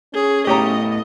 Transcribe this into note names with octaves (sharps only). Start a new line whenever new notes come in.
C#4 G#4
A2 A3 B3 G4 C#5 D#5 A#5